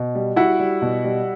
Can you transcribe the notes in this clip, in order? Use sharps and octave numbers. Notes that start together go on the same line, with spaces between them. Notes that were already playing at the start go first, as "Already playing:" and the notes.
Already playing: B2
G3
G3 E4 F#4
G3
B2
G3